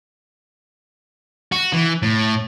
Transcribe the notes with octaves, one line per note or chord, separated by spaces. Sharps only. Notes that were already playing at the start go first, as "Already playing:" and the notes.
F#4
E3
A2